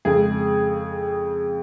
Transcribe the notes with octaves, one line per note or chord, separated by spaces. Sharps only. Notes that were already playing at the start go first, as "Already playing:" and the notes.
F2 C#3 G#3 G#4